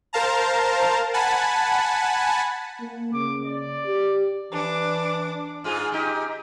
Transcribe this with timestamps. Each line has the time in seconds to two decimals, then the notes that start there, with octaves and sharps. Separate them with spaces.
0.13 A#4 C5 F5 A5 A#5
1.14 F#5 G#5 A5 B5
2.81 A#3
3.13 C#3 D6
3.46 D5
3.87 G4
4.52 E3 D4 D6
5.64 G#2 F4 G#4
5.92 D#4 G4